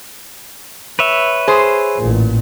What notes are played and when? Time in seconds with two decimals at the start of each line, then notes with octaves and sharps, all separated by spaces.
0.99 B4 C#5 E5
1.48 G#4 C5
1.98 A1 A#2